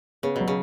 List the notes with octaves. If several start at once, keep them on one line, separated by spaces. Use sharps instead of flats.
C#3 B3
B2 F#3
C#3